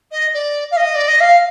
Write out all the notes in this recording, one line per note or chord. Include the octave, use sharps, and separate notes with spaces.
D#5
D5
F5
D#5
D5
D#5
F5